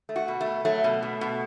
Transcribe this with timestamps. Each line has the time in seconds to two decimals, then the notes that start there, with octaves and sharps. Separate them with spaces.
0.09 A3
0.16 F#4
0.28 B2
0.41 A3
0.46 B2
0.65 F#3 A3
0.84 B2
1.03 B2
1.21 B2